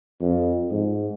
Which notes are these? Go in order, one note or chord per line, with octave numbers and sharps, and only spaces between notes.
F2
G#2